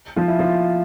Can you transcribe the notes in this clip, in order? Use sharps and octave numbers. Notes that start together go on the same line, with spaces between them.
F3 F4
E4
F3 F4